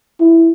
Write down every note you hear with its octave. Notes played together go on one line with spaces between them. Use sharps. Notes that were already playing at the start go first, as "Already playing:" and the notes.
E4